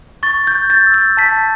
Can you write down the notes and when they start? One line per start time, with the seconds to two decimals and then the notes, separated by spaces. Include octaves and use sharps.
0.23 C#6 A6
0.47 G6
0.55 C#6
0.70 A6
0.87 E6
0.94 A6
1.17 A5 B6